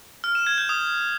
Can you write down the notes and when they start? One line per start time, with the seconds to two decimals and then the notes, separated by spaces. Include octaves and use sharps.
0.24 F6
0.35 E7
0.47 G#6
0.58 G6
0.69 D#6